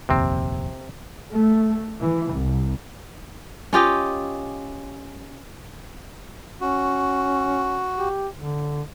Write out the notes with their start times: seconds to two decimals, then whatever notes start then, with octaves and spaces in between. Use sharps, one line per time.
0.09 F1 A#1 D#2 C3 C4
1.32 A3
1.99 E3
2.31 C2
3.73 C#4 F4 G4 D#5
6.61 C#4 F#4
7.98 G4
8.37 D3